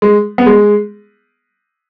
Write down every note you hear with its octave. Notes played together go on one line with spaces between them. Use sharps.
G#3
B3
G#3